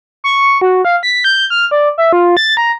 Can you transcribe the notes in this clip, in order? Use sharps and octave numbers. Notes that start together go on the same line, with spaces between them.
C#6
F#4
F5
B6
G6
F6
D5
E5
F4
A6
A#5